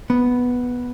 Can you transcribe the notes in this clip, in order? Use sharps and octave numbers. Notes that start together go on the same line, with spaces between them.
B3